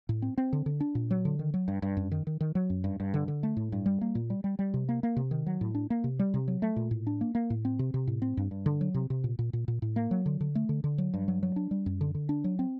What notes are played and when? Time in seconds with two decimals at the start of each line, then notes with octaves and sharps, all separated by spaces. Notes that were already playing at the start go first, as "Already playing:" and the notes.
0.09 A2
0.22 C4
0.38 C4
0.53 D3
0.66 D3
0.80 D4
0.95 A#2
1.11 F#3
1.25 D3
1.39 D#3
1.54 F#3
1.68 G2
1.82 G2
1.97 F#2
2.12 D#3
2.27 D#3
2.41 D#3
2.55 F#3
2.70 F#2
2.84 G2
3.00 G2
3.14 D3
3.28 D3
3.43 A3
3.57 A2
3.72 G2
3.86 G3
4.01 A#3
4.15 A#2
4.30 G3
4.44 G3
4.59 G3
4.74 C3
4.89 A#3
5.03 A#3
5.16 C3
5.31 D#3
5.46 F#3
5.61 A2
5.75 D4
5.90 A#3
6.04 C3
6.19 G3
6.34 C3
6.48 F#3
6.62 A3
6.76 A#2
6.91 A2
7.07 D4
7.21 A#3
7.35 A#3
7.50 A2
7.65 C4
7.79 C3
7.94 C3
8.07 A2
8.22 C4
8.37 G2
8.51 G2
8.66 D3
8.81 F#3
8.94 C3
9.10 C3
9.24 A#2
9.39 A#2
9.53 A#2
9.68 A#2
9.82 A2
9.96 A#3
10.11 F#3
10.26 D3
10.41 D3
10.55 A3
10.69 D3
10.84 D3
10.98 F#3
11.14 G2
11.28 F#3
11.43 F#3
11.56 D4
11.71 G3
11.86 F#2
12.01 D3
12.15 D3
12.29 D4
12.44 F#3
12.59 C4